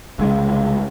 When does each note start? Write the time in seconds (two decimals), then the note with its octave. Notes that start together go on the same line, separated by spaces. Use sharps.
0.19 C2 C#3 G#3